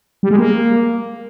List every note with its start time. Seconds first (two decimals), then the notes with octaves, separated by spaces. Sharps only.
0.23 G3
0.31 G#3
0.39 A#3